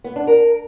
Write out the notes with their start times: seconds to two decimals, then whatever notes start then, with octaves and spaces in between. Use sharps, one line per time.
0.04 B3
0.16 D4
0.27 A#4